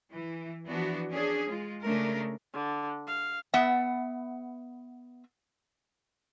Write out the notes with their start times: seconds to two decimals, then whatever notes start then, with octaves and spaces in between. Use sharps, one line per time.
0.13 E3
0.67 E3 F3 B3 D4 F#4
1.11 C#4 D4 G#4
1.49 G#3 F4
1.83 C#3 A3 D4 A#4
2.53 D3
3.07 F5
3.54 B3 E5 F#5